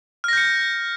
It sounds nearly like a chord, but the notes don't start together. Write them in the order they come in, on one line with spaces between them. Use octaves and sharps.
F6 A#6 G6 C#7